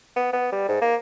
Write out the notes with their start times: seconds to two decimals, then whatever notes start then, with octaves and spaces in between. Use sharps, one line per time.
0.16 B3
0.33 B3
0.52 G3
0.68 G#2
0.82 A#3